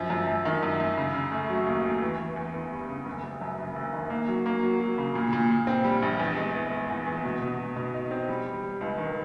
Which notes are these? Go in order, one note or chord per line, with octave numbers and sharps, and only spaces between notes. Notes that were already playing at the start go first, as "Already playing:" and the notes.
Already playing: F#2 F3
F#2
F#2
D#3
F#2
F#2
C#3
C#3
A3
F#3
D#2
A3
E3
E3
E2
E2
G3
C#3
F#1
F#1
F#2
F#1
F#1
D#3
A#3
F#3
A#3
F#3
F#3
C#3
A#2
A#2
A#2
C4
G3
A#1
E2
G#3
E2
G#3
E2
E2
B2
B2
B2
B2
D#4
C4
G3
G3
G3
C#2
D#3